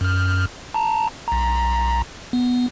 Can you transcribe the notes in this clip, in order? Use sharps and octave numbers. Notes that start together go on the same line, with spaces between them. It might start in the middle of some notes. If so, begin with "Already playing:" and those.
F#2 F6
A5 A#5
B1 A#5
B3